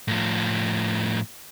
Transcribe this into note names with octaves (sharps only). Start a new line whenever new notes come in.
A2 F3